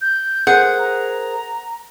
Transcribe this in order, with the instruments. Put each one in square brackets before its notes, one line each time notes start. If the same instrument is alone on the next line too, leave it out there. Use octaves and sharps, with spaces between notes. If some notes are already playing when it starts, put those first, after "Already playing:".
[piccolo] G6
[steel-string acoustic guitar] G#4 A#4 C5 [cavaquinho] F#5
[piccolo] A#5